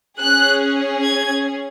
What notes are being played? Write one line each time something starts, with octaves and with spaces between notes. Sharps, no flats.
C#4 G#4 F#6
G#6